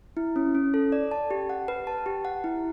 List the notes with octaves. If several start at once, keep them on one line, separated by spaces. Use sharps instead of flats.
E4
C#4
C#4
A4
D5
A5
G4
F#5
B4
A5
G4
F#5
E4